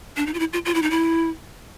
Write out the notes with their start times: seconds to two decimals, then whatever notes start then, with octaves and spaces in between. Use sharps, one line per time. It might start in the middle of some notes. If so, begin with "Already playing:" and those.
0.17 D4
0.26 D#4
0.34 F4
0.39 E4
0.53 F4
0.65 F4
0.74 E4
0.82 D#4
0.90 E4